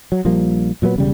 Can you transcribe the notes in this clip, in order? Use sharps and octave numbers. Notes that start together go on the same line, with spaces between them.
F#3
A#1 F3 G3 A#3
A#2 F#3 G3 B3
E1 C#3 G3